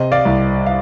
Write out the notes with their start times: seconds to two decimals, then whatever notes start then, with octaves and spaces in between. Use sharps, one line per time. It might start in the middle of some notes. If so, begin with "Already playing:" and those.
Already playing: C3 C5 D#5
0.12 D5 F5
0.25 C2
0.66 F5